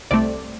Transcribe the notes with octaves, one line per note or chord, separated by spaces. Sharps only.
C2 C3 A3 C4 D5